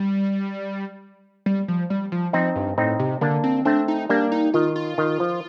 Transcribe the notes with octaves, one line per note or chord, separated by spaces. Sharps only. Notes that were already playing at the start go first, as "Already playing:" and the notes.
Already playing: G3
G3
F3
G3
F3
F3 C4 D#4
G2
A2 C4 D#4
C3
D3 A#3 D4
C4
A3 C4 D4
D#4
G3 A#3 D4
D#4
D#3 F4
F4
D#3
F3